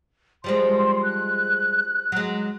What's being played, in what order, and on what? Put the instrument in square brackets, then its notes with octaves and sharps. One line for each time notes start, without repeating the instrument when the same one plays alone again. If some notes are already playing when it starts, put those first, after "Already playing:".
[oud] F3 G3 G#3 [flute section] C6
[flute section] F#6
[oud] F#3 G#3